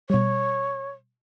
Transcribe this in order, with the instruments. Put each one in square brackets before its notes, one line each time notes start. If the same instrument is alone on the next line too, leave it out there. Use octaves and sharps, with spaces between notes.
[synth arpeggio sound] B2 G3 [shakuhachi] C#5